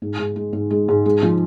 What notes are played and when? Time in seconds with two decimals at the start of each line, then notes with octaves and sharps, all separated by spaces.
0.02 G#2
0.19 G#2
0.36 G#3
0.53 G#2
0.71 G#3
0.88 G#2
1.06 G#3
1.23 F3